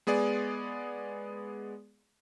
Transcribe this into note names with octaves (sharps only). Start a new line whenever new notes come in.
G#3 B3 G#4 D5